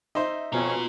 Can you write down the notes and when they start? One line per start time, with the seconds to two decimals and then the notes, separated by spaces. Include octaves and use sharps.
0.15 D#4 C5 E5
0.53 F2 B2 C#4 F4 A#5